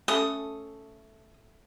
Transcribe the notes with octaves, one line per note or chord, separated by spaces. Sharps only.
A3 C#4 A4 D#6